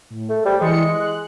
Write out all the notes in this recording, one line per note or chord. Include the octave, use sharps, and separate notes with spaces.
A2
A3
G3 C5
E3 G#3 C6 C#7
F#6